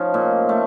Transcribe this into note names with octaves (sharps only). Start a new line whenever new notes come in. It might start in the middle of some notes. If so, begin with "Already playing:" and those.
Already playing: F3 C#4 D#4
A#2
A3